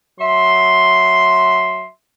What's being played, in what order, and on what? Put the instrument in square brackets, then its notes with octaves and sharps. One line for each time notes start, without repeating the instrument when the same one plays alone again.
[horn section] F#3 E5 C6